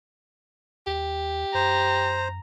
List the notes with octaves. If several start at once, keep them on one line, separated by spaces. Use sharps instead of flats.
D#2 G4
F#2 C5 A#5